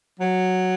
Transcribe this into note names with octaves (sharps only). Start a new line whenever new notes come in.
F#3